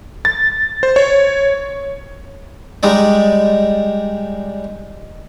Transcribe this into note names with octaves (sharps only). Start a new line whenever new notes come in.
A6
C5
C#5
G3 G#3 D#4 D5